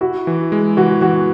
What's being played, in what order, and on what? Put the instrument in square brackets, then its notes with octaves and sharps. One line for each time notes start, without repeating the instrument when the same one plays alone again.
[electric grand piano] E4 [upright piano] F#4
[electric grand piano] E3
G#3
[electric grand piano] E3 [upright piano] F#4
[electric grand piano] E3 [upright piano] F#4